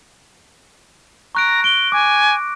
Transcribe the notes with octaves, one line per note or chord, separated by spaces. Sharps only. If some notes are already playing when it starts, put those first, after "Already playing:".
A#5 C#6 F#6 D7
A#6
D7 G7
G#5 D6